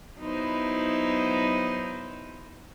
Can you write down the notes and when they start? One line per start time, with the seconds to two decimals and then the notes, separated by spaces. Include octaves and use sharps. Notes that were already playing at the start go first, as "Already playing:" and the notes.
0.19 F#3 B3 D#4 E4 B4 C5